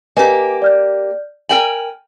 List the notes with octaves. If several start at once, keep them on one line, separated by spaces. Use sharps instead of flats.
A#3 G4 B4 D#5 G#5
D5 F6 G6
A#4 G5 G#5 F#7